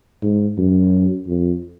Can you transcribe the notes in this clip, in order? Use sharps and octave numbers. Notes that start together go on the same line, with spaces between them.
G#2
F#2
F2